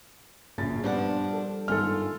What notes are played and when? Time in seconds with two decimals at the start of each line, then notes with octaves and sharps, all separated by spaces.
0.58 A#1 F#2 A#2 C#3 A6
0.84 G2 F3 G3 B3 D4 F#5
1.33 A4
1.68 G1 G#2 D#3 F4 A4 G#5 F6